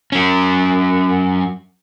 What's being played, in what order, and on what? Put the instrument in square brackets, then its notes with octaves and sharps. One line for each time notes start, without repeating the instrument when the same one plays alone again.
[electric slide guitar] F#3 C#4